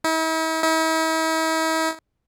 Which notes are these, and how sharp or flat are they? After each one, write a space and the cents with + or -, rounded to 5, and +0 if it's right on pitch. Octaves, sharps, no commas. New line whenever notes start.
E4 -45
E4 -45